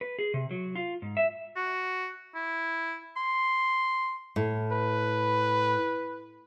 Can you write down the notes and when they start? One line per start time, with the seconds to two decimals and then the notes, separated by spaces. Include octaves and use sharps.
0.01 B4
0.19 G#4
0.34 C3
0.51 F#3
0.75 F4
1.02 G#2
1.17 E5
1.56 F#4
2.35 E4
3.17 C6
4.36 A2
4.72 B4